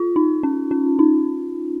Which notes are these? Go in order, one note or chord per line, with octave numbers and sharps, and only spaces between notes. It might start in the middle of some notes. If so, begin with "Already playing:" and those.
Already playing: F4
D#4
C#4
C#4
D#4